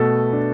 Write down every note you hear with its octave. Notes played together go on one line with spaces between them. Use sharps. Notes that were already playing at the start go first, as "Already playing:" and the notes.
Already playing: B2 A3 A4 B4
D4